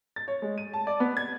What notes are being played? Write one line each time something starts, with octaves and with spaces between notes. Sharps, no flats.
A6
C#5
G#3
D#7
A5
D5
B3
G#6